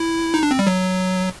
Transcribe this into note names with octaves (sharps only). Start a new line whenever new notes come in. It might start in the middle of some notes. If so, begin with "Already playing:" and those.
Already playing: E4
D#4
D4
C4
G3
F#3